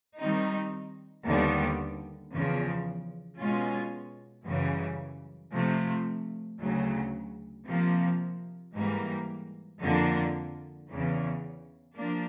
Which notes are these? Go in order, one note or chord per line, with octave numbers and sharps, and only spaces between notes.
D#3 G3 C4 D#4
D#2 D3 G3 B3
E2 C#3 F3
B2 G#3 C#4 F4
F#2 C#3 E3 G3
C3 F3 A3
D2 C#3 F#3
C3 F3 A#3
G#2 E3 G3 A#3
F2 D3 F3 A#3 D4
E2 C#3 E3
F3 A#3 D4